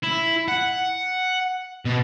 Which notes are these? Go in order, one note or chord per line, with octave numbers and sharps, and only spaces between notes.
E4
F#5
B2